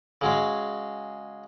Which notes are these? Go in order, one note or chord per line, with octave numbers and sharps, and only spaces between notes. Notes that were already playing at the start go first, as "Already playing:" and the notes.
C#3 F#3 G#3